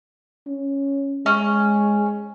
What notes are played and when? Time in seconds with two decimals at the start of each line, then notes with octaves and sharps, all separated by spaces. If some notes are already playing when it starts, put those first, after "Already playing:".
0.47 C#4
1.26 G#3 C#4